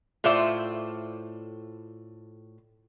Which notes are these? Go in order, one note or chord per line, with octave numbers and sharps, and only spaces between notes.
A2 F4 C5 D5 E5